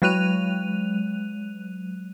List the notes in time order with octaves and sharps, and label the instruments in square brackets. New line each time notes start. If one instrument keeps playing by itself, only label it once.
[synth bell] F#3 G#3 F#6 D#7 F7